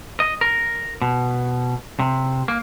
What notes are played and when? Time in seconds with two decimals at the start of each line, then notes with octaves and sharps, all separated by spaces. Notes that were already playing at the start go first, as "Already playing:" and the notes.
0.20 D#5
0.41 A#4
1.02 B2
1.99 C3
2.48 A#3